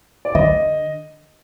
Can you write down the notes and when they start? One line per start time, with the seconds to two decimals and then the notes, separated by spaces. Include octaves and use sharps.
0.25 D5
0.35 D3 D#5